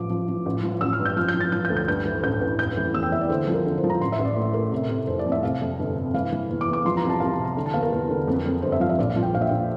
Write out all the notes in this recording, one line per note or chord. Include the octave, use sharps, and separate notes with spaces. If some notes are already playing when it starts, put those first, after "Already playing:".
Already playing: A1 F3 D6
F3
F3
A1
F3
A1 E6
F6
G2
G6
F3 F6
G6
F3
A6
F3 G6
G6
D2
G6
G2 G6
E3
A1 G6
A1
F1 G6
E3
E2 E6
G5
E2 E5
D5
D3 C5
C5
F3
A#4
D3
C5
F3
A#5
A1 C6
E5
A1
D5
A2
A2 A#4
C3
C3
F1 C5
D5
F2
E5
C3 F5
F2
G1
C3
E3 F5
E3
E2
D6
E2
D6
F3 C6
A#5
C2
A5
C2 F5
A5
C3
C6
D3
A5
E2 F5
A#4
E2
D3
F2
F2
G1 C5
E5
F3 F5
E5
A#1 D5
F5
F3
G5
A#1 F5
E5
A#1 F5